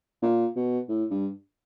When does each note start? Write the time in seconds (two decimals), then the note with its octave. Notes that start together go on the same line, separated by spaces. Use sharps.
0.23 A#2
0.56 B2
0.89 A2
1.11 G2